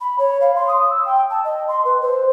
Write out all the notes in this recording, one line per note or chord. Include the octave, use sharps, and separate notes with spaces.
B5
C#5
F5
C6
D#6
E6
G5
A5
D#5
C6
B4
C5